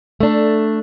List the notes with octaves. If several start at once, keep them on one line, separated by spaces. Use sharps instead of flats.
A3 D4